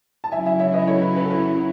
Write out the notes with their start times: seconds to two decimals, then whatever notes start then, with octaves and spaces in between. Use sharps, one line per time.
0.24 A5
0.31 C#3 F#3 C#4 E4 E5 G#5
0.46 E5 G#5
0.60 C#5 E5
0.74 B4 D#5
0.87 A4 C#5
1.02 B4
1.16 B4
1.25 A4
1.30 B4